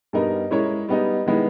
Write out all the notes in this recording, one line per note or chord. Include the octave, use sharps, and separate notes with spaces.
G2 G3 B3 D#4 A#4
G#3 C#4 E4 A#4 C#5
G3 B3 D#4
D#3 G#3 B3 E4